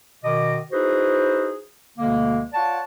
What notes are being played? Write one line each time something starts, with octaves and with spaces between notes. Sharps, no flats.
B2 D#3 D#5 D6
D#4 E4 F#4 G#4 B4 C5
D2 B2 D3 G#3 A#3
F4 C#5 D5 F#5 A5